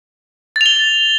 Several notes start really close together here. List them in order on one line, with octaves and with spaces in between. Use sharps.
A6 F7 G7